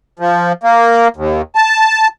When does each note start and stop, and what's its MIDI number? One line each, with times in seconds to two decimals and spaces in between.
0.19 0.52 53
0.63 1.08 58
1.17 1.42 39
1.55 2.08 81